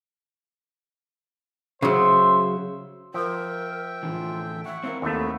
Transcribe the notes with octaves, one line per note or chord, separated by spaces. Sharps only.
C#3 F#3 C5 E5 C6
F3 A#4 E5 G5
A2 D3 E3 F4
E5 F#5 C#6
C4 E4 A#4 F5
D#2 A3 B3 F#4 E5 F5